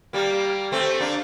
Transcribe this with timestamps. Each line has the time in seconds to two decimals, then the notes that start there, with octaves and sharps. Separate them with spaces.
0.13 G3 A#3
0.72 A3 C4
1.00 A#3 D4